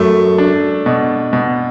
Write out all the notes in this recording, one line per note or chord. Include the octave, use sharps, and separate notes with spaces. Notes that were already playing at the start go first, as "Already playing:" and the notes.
Already playing: F#2 A3
D4
B2
B2